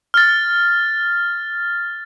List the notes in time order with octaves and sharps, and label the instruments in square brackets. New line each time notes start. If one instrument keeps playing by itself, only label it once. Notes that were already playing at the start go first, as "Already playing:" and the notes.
[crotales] F6 A6